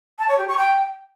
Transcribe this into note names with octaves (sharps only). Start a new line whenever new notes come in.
A5
C#5
G4
C#6
G5